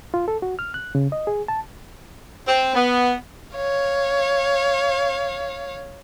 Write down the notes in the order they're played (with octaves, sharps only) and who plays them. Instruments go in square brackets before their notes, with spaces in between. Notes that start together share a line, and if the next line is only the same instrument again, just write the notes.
[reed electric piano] F4
A4
F#4
F6
F#6
C#3
D#5
G#4
A5
[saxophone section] C4
B3
[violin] C#5 F5